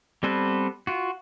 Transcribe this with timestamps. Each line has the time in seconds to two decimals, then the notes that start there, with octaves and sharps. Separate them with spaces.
0.23 G3 B3 C4 A4 B4
0.87 F4 F#4